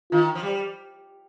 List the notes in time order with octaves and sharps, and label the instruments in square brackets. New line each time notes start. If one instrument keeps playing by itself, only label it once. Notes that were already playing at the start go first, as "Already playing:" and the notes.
[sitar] D#3 [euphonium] F4
[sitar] F3
G3